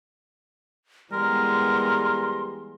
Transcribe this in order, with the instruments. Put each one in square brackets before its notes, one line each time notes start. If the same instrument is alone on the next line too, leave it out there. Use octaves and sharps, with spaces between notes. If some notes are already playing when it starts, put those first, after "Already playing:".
[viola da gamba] E3 G#3 B3 [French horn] G3 [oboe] A#4 [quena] C6